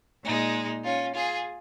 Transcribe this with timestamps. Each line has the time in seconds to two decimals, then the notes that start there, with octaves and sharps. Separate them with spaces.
0.23 A#2 G#3 D#4
0.83 C#4 F4
1.14 F4 G#4